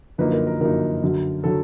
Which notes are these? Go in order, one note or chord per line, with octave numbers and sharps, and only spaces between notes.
F#2 D3 F3 A#3 D#4 B4
A#4
A#4
F#2 D3 F3 A#3 D#4 A#4
F#2 D3 F#3
D3 F#3 A4